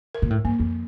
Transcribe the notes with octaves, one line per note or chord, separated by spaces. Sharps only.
A#4
A#2
A2
G2 A#3
F2